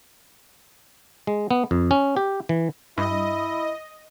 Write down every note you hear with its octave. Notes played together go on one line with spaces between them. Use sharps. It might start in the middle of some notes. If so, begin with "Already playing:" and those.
G#3
B3
F2
C#4
G4
E3
G2 E4 D#5